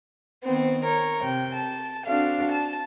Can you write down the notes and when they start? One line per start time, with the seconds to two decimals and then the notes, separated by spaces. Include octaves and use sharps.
0.43 D#3 B3 C4
0.84 A#4 C#5
1.22 C3 G5
1.54 A5
2.06 C4 D4 F#4 A4 F5
2.51 A5